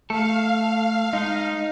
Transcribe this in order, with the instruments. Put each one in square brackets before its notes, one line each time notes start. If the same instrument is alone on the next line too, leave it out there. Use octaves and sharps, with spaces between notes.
[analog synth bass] A3 [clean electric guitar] A4 [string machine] F5
[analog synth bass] G#3 [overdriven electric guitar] D#4